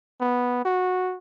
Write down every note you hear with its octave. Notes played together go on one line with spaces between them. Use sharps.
B3
F#4